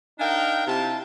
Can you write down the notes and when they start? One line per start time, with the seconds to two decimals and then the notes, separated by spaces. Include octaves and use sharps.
0.19 D4 D#4 A#4 F5 G5
0.67 C3 E4 F4 G4 A5